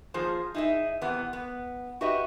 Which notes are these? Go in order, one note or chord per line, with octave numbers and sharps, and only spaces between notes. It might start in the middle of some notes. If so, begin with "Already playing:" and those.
F3 A#3 F4 G#4 C5
D#4 E4 G#4 A4 E5
C3 E3 B3
B3
F#4 G4 B4 D#5 E5